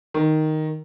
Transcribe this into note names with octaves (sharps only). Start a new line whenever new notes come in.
D#3